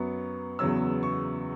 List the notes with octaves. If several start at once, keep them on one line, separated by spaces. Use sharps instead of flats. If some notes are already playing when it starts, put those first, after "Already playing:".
Already playing: F#2 F#3 B3 C#6
E2 C#3 F#3 B3 E6
C#6